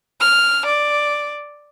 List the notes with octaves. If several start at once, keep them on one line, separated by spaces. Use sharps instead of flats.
F6
D5